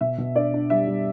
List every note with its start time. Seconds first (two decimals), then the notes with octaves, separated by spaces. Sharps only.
0.01 B2 E5
0.18 B2
0.36 D4 D5
0.54 D4
0.70 G3 E5
0.87 G3